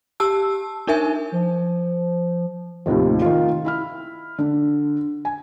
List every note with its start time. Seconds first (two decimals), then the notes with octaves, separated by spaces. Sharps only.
0.20 G4 A5 E6
0.87 D4 D#4 A#4 E5 G#5
1.32 F3
2.86 D#2 A2 C3 D#3 F3
3.22 D#3 F4
3.65 E4 B5 F6
4.39 D3
5.25 G#5